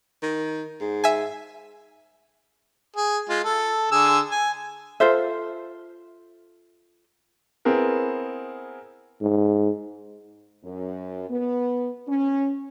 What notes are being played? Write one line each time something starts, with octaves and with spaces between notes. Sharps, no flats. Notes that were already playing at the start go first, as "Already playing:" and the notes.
D#3
G#2
E5 G#5
G#4
G#3 F4
A4
D3 G#4 E6
G#5
F4 A4 C5 E5
B3 C4 E4 G#4 A#4
G#2
F#2
B3
C#4